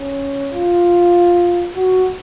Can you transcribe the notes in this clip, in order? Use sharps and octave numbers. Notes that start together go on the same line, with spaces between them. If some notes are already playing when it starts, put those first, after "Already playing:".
Already playing: C#4
F4
F#4